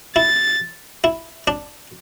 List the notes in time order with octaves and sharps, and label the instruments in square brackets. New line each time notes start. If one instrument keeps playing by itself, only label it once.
[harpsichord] E4 [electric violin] A6
[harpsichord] E4
D4